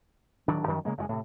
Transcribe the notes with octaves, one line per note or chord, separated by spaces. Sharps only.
D1 D#3 F#3 D4
F#2 D#3 F3 G3
C#3 G#3 A#3
F#1 F#2 D3 G#3
A2 C3